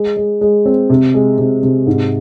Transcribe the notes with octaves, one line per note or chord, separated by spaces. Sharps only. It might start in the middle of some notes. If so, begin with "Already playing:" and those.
Already playing: G#3
G#3
G#3
C4
C3
G#3
C3
C3
G#2